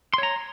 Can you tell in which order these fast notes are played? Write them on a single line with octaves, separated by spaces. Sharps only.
C6 C#5 A#5